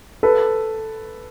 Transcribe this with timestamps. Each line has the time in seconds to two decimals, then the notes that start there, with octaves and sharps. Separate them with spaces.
0.23 A4 B4